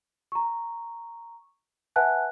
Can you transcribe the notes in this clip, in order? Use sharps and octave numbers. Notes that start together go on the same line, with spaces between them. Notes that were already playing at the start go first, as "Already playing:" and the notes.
A#5 C#6
B4 E5 F#5 G#5 A5 F#6